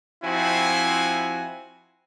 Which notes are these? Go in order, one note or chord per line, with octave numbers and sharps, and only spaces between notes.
F3 C4 E4 F#4 G#5